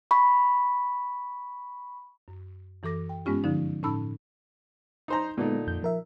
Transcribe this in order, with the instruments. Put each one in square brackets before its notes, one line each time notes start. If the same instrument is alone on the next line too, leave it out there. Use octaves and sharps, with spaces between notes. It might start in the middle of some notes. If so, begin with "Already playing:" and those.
[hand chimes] B5 C#6
[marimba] F#2
F#2 E3 A4 D6 A#6
G5
G2 G#3 B3 C#4 F4 G4
D3 F3 D#4
A2 C#4 D#4 A5 B5 E6
[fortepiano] D#4 C5 A#5
[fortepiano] A#2 D3 D#4 [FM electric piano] G#3 B3
[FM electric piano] F2 G6
F3 A#4 E5